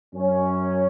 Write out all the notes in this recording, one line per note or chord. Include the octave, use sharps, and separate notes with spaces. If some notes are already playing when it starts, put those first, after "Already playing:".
F#2 C#4